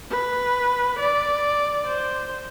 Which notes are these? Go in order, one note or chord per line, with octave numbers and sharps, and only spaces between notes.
B4
D5
C5